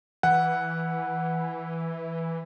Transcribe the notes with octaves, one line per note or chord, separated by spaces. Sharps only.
E3 F#5